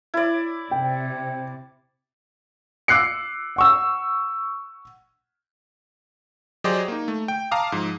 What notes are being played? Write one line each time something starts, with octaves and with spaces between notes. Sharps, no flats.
E4 D5
C3 G5
D6 E6 F#6 C7 C#7
F#5 C#6 E6
F#3 G4 G#4 C5 D5 D#5
A#3 D#4
A3
G5
F5 A5 A#5 D6 D#6
G#2 F3